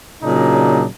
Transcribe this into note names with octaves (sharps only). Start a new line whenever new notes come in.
A#2 C#3 F#3 D4 D#4